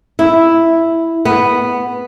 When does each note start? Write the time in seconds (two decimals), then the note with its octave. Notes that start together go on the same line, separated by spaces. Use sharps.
0.19 E4
1.25 B3